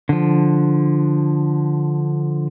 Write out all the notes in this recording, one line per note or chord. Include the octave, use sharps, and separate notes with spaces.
D3 F3